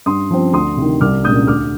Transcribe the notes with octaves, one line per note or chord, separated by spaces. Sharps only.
G2 C6 D#6
F3 C4
D2 C6 D#6
C3 D#3
C2 D6 F6
A#2 G#3 D4 D#6 G6
D2 D6 F6